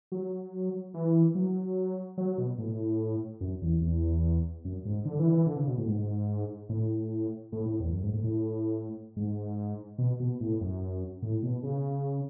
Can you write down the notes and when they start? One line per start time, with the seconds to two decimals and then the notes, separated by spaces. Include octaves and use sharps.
0.12 F#3
0.94 E3
1.35 F#3
2.18 F#3
2.38 B2
2.58 A2
3.41 F#2
3.62 E2
3.81 E2
4.65 F#2
4.85 G#2
5.05 D3
5.19 E3
5.32 E3
5.46 D3
5.57 C#3
5.67 B2
5.78 A2
5.87 G#2
6.69 A2
7.52 A2
7.66 A2
7.80 E2
7.93 F#2
8.03 G#2
8.14 A2
8.24 A2
9.16 G#2
9.98 B2
10.20 B2
10.40 A2
10.60 F#2
11.22 A2
11.43 B2
11.63 C#3